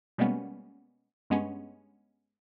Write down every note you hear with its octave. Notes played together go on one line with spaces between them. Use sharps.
B2 G3 G#3 A#3 B3 C#4
G2 G#3 B3 C#4